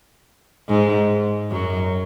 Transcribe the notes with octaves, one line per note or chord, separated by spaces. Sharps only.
G#2 G#3
F#2 F#3